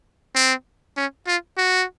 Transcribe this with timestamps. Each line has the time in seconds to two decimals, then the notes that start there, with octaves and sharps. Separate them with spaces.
0.35 C4
0.97 C#4
1.27 F4
1.58 F#4